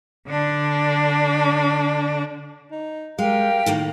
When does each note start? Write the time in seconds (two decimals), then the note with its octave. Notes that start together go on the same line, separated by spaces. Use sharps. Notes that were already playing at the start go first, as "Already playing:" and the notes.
0.28 D3 D4
2.71 D#4
3.19 G#3 G4 A#4 F5 G5
3.66 A2 D#3 A#3